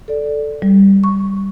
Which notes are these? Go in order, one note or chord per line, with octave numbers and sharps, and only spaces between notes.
A4 D5
G3
C#6